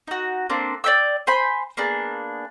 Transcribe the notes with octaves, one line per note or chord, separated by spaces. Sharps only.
D#4 F#4
A#3 C4 D4
D5 E5 G5 E6
C5 G#5 B5 C6
A#3 B3 D4 G#4